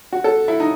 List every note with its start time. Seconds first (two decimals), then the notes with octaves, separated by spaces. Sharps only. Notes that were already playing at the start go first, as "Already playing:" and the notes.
0.12 F#4
0.24 A4
0.48 E4
0.60 D#4